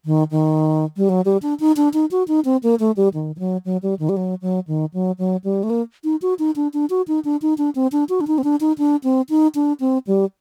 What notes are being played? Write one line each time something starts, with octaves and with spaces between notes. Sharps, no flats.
D#3
D#3
G3
F#3
G3
D4
D#4
D4
D#4
F#4
D#4
C4
A#3
A3
G3
D#3
D#3
F#3
F#3
G3
D#3
G3
F#3
F#3
D#3
F#3
F#3
G3
A3
A#3
D#4
F#4
D#4
D4
D4
F#4
D#4
D4
D#4
D4
C4
D4
F#4
D4
D#4
C4
D4
D#4
D4
C4
D#4
D4
C4
G3